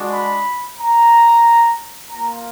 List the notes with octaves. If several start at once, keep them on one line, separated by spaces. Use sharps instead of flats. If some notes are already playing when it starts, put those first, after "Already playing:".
Already playing: G#3 D4 F#4
B5
A#5
A#3 F4 A#5